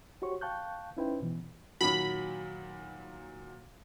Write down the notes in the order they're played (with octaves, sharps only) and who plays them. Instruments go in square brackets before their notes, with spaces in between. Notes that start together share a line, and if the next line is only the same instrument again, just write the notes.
[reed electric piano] F#4 G4 C5 C#5 C#6
F5 G5 A5 C#6 F#6 G6
C#4 D#4 E4 B4 C5 G5
B2 E3
[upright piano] A#2 D#3 F#3 [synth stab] B5